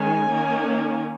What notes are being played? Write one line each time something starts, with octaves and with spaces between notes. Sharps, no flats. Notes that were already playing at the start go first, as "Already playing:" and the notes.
Already playing: D#3 G#3 C#4 G#5
D#3 A#3 C#4